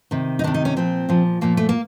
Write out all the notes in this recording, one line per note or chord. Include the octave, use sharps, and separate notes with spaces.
C3 D#3
D#4
C3 D#3 D4
D#4
C#4
A#2 F3 C4
A#2 F3
A#2 F3 A#3
A3
A#3